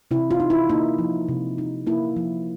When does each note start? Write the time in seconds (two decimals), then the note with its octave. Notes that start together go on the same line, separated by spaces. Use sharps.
0.11 C3 E4
0.31 F4
0.40 D#4
0.50 E4
0.69 A#3 D#4
0.99 F3
1.28 C3
1.58 D#4
1.87 A#3 E4
2.17 F3